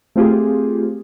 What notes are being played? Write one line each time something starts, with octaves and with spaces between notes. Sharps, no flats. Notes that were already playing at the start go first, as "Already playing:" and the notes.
A3 C4 F4 G4 G#4